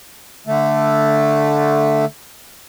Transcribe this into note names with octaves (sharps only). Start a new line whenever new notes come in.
D3 A3